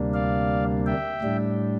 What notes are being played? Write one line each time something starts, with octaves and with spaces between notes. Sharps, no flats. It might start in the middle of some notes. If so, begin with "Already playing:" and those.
Already playing: D2 C3 G3 A#3 D4
D5 F5
E5 G5
A2 G3 D4